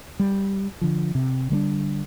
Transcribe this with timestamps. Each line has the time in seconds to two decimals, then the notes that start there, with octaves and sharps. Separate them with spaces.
0.19 G3
0.81 D3 F3
1.15 C3
1.50 D3 G3 G#3 D4